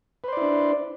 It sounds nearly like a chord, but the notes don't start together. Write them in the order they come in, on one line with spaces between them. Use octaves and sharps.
B4 C5 D5 E4 D4